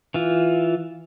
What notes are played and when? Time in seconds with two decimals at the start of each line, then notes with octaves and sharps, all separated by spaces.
0.14 E3 F4